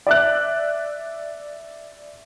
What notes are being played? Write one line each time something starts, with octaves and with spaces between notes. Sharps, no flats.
D5 E5 F#6